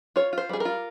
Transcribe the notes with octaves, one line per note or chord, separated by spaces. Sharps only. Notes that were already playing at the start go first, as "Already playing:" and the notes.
F4 C#5
F4 C5
G3 G#4
F4 A#4